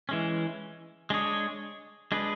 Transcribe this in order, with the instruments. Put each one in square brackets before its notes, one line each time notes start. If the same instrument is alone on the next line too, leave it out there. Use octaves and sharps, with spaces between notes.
[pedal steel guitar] E3 G#3 C#4
G#3 D4 G#4 C#5
G#3 D4 G#4 B4